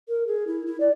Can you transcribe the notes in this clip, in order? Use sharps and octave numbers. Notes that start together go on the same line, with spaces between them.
A#4
G#4
E4
E4
D5